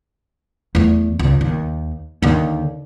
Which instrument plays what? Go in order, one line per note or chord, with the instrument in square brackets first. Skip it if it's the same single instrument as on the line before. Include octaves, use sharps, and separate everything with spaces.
[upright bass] E2 A3
C#2
D#2
D#2 D3